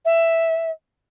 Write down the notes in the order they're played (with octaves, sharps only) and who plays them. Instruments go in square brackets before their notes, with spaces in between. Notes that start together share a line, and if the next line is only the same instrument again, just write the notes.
[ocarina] E5